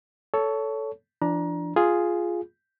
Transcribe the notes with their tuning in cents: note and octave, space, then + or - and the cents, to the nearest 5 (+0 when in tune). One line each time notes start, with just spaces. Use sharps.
A4 +0 C#5 +20
F3 -40 D4 +5 A#5 +25
F4 +0 G#4 +0